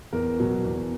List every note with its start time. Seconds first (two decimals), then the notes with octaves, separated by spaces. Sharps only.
0.13 E2 A#4
0.40 B2 F#3
0.65 E2